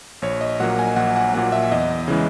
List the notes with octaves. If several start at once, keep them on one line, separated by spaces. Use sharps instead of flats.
A#1 C#5
D#5
A#2 F#3 A#3 F#5
G#5
A#1 F#5
F#5
A#2 F#3 A#3 F#5
E5
E2 D#5
C#3 E3 G#3